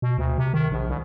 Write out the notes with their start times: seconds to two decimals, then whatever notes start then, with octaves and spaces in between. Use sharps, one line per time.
0.02 B2
0.18 D2
0.38 C3
0.54 D#3
0.71 A#1
0.89 C2